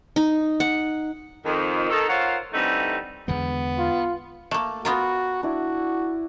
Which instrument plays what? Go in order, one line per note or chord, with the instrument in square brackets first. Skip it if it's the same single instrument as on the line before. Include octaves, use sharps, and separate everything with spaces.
[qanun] D#4
F#5
[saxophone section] F2 D#3
D#3 A4
F4 A#4 C5 C#5 F5 F#5
D3 E3 G3 A3 C4 D#4
[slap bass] E2 D3 G#3 [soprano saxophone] B3
[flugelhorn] F4
[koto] A3 A#3 [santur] A5
[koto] B3 F4 A#4 [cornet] F#4
[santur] D4 E4 [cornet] F#4